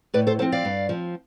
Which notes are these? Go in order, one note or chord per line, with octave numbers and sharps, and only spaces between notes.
A2 B4 D5
A4 C5
F3 C4 A4 C5
D5 F5
G2
F3 C4